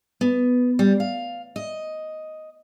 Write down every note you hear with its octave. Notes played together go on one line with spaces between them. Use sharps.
B3
G3
F5
D#5